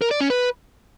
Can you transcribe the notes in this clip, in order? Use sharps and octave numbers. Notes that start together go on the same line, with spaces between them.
A#4
D5
C#4
B4